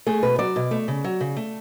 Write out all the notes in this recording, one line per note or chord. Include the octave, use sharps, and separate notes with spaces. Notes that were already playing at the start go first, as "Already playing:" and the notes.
A3 G#4
B2 B4
F#3 D5
B2
A3
C#3
F#3
C#3
A3